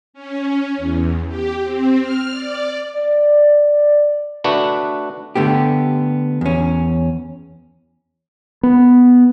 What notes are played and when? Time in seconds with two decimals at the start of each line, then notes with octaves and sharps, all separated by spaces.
0.14 C#4
0.77 E2
1.28 G4
1.63 C4
2.00 F6
2.31 D5
2.94 D5
4.44 A3 D4 F#4 B4
5.35 D3 A3 B3 G4
6.41 E2 C#4
8.63 B3